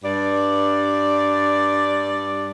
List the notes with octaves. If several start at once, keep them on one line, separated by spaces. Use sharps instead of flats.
G2 D5